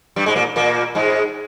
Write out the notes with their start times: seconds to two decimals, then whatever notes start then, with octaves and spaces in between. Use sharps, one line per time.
0.16 G2 G3
0.26 G#2 G#3
0.36 A#2 A#3
0.56 A#2 A#3
0.95 G#2 G#3